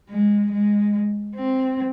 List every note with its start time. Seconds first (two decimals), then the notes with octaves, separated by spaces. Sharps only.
0.10 G#3
0.52 G#3
1.36 C4